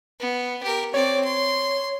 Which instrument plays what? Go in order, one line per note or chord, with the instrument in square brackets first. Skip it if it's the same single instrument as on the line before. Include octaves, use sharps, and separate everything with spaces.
[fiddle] B3
G4 A#4
[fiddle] C4 D5 [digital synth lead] C#5
[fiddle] C6